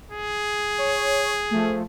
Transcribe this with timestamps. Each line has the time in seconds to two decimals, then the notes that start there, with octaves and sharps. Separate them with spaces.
0.11 G#4
0.78 C#5
1.51 F3 A3